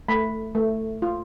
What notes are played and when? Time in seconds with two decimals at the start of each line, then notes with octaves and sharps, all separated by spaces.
0.08 A3 B5
0.55 A3
1.02 F4